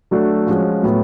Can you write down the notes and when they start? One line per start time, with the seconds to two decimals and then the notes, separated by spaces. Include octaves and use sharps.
0.11 F#3 A3 D4 F#4 A4
0.47 F3 G#3 C#4 F#4
0.83 A2 F#3 B3